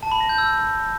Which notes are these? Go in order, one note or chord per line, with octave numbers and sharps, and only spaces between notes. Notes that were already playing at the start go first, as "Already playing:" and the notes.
A5
B5
A#6
G6
E6